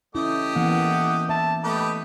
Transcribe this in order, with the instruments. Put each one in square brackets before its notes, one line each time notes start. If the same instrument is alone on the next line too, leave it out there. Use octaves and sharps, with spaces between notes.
[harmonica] A3 G4 D#5 [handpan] C#4 E4
[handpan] E3 A#3 B3 [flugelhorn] F#5
[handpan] E5 [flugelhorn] A5
[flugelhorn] A3 [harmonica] G4 B4 D#5